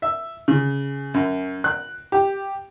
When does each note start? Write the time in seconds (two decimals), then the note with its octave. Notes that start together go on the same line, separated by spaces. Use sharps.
0.02 E5
0.48 C#3
1.14 F#2
1.64 F#6
2.12 G4